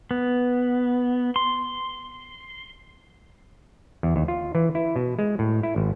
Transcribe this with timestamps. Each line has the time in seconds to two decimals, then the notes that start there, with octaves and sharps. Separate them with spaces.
0.11 B3
1.36 C6
4.03 E2
4.16 D#2
4.28 F4
4.55 E3
4.75 E4
4.96 B2
5.19 G#3
5.39 A2
5.63 E4
5.76 G#1